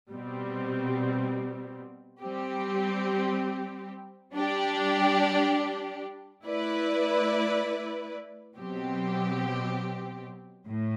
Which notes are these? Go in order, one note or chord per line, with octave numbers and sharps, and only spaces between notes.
B2 G3 C4
G3 C4 G4
G3 D4 G4
A3 E4 B4 D5
B2 F#3 C4 G4
A2